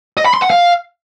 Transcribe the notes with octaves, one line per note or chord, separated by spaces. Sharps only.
D#5
B5
C6
F#5
F5